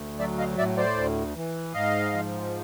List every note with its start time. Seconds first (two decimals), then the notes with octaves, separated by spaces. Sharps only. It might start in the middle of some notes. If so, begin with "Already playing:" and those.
Already playing: D2
0.19 F#3 D5 E5
0.39 D#5 F5
0.58 A2 D5 E5
0.77 C5 D5
0.96 D2
1.36 E3
1.74 G#2 D#5 F5
2.13 F3